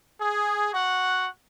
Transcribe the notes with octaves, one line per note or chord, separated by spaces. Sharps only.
G#4
F#4 F#5